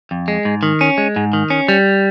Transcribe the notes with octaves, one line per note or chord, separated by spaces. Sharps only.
F2
G#3
G#2
D#3
C#4
G#3
G#2
D#3
C#4
G3